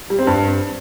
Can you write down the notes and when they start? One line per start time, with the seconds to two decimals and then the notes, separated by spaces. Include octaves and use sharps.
0.10 G3
0.19 C4
0.27 G2